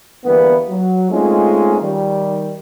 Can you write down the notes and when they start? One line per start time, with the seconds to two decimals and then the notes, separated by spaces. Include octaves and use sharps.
0.25 E2 D3 E3 G3 A#3 B3
0.68 F#3
1.10 G#3 A3 C4 C#4 D#4 F4
1.80 D#3 G3